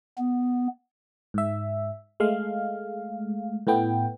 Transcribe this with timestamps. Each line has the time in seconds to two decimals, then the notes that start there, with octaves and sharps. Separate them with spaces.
0.18 B3
1.34 G#2 E5
2.20 G#3 A3 F5
3.67 A2 A3 B3 G5